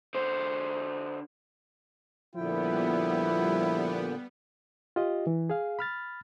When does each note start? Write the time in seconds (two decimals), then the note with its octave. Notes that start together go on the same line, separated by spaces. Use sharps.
0.15 D3 C5
2.35 A#2 D3 F3 G3 B3 E4 G5
4.96 F4 G4 D#5
5.27 E3
5.50 G#4 F5
5.79 B5 F6 A6